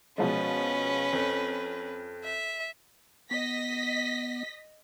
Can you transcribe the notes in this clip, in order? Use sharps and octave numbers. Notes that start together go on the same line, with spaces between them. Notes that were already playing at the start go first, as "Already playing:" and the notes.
B2 F3 G#3 C#4 B4
F2
E5
B3 D#5 A#6 B6